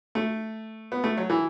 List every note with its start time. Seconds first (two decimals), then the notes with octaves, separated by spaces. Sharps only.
0.15 A3
0.92 B3
1.04 A3
1.17 F#3
1.30 E3